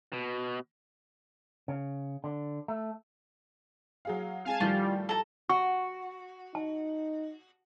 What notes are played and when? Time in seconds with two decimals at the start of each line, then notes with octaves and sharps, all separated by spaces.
0.13 B2
1.68 C#3
2.24 D3
2.68 A3
4.05 F#3 G#4 F5
4.45 G#3 C4 F5 G#5 A5
4.60 A2 D#3 F3 G3 F4
5.09 A4 A#5
5.49 F#4 C#6
6.55 D#4 A5